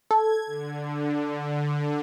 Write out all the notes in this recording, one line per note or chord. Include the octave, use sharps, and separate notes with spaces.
A4 G#6
D3